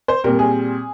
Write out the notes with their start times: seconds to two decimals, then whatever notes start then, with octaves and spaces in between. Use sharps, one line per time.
0.08 C5
0.24 A#2 G3 C4 A#4
0.39 G#4